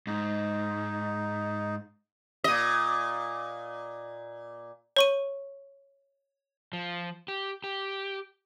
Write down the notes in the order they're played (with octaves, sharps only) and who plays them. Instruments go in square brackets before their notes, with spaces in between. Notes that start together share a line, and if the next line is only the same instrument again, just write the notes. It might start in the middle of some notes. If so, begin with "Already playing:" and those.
[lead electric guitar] G#2 [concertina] D#4
[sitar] A#2 D#5
[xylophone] C#5 C#6 D#7
[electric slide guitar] F3
G4
G4